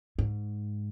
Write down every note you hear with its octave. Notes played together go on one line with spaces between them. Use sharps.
G#2